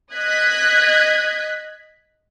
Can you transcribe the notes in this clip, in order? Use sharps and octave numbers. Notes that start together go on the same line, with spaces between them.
D#5 F#6 G#6 B6